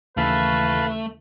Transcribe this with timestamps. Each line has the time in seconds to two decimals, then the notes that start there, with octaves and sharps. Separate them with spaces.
0.17 D#2 C#3 E3 A3 B4 F5 A5 B5